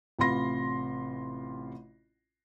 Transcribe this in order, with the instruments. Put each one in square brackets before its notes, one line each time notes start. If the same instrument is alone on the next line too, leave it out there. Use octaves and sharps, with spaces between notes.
[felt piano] A1 C3 F4 B5 C6 A#6